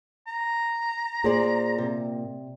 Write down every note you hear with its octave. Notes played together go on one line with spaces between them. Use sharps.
A#5
A#2 G#4 C5 D5
C3